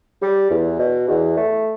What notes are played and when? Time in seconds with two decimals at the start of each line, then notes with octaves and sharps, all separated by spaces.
0.22 G3
0.51 E2
0.80 B2
1.08 E2
1.37 A3